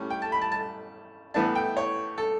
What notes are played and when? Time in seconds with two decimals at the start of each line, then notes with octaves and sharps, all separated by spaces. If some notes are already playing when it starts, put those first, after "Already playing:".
Already playing: A2 G3 C#4
0.10 G5
0.22 A5
0.32 B5
0.41 A5
0.52 A5
1.34 A2 E3 B3 D4 A5
1.55 G5
1.77 C#5
2.18 A4